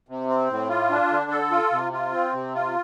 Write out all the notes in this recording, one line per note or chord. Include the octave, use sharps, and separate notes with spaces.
C3
C4
A2
F4
D4
D3
A4
F4
C3
F4
C4
C3
F4